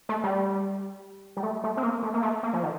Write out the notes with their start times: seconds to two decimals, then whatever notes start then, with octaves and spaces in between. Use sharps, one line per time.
0.09 A3
0.24 G3
1.37 G3
1.43 A3
1.64 A3
1.77 C4
1.83 A#3
2.03 A3
2.14 A#3
2.22 A3
2.43 A#3
2.53 F3
2.63 D#3